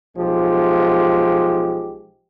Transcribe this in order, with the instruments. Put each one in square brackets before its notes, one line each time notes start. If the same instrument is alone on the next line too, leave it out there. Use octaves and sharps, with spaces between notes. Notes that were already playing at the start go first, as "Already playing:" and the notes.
[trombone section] B1 F3 G#3 G4